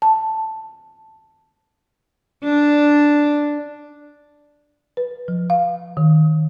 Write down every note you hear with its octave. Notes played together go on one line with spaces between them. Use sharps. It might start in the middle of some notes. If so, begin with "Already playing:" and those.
A5
D4
B4
F3
F5
D#3